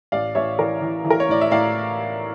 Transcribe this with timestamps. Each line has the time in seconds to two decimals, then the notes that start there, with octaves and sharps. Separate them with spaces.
0.12 A1 D5 F5
0.35 A1 C#5 E5
0.58 E3 A#4 D5
0.81 E3
1.05 E3
1.10 A#4
1.20 C#5
1.29 A2 D5
1.41 E5
1.51 A2 D5 F5